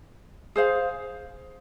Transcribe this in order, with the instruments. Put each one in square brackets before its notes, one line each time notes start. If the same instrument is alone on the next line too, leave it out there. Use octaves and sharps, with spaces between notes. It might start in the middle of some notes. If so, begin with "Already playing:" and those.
[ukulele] G#4 C5 F5